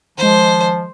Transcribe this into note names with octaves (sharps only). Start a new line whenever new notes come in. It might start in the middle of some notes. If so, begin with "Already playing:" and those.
D#3 F3 G#3 C5